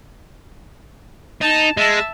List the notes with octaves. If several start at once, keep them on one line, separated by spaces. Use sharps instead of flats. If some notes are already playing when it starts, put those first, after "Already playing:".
D#4 A5
G#3 E5 A5